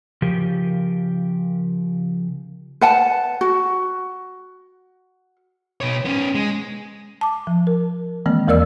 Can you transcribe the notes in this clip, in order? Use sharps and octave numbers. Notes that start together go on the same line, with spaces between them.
C#3 F3 G4 A#4
B4 F#5 A5
F#4
B2 C#5
B3 C#4
G#3
A5 D6
F3
A#4
D#3 E3 G#3 A#3 C4
E2 E3 A#4 D5 E6